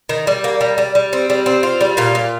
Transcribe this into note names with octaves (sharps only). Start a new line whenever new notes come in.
D#3
G3
A#3
G3
G3
G3
C4
G3
C4
F4
G3
A#2 F4
A#2